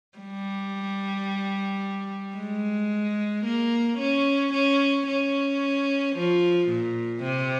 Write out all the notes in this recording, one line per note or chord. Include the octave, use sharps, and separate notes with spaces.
G3
G#3
A#3
C#4
C#4
C#4
F3
A#2
C3